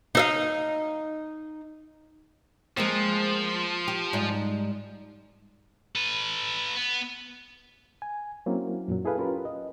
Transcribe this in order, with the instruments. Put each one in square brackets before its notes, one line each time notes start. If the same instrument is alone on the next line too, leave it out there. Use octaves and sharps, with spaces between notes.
[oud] D#4 E5 F5
[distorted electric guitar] F3 [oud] G#3 A#3 C4
[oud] G4
G#2 G3 D#4
[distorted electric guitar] A4 B4
B3
[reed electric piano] G#5
F#3 A#3 C4 C#4 E4
F#2 A#2 F#3
E4 G#4 A4 B4 F5
C#4 F4 G4 A#4 B4
D#5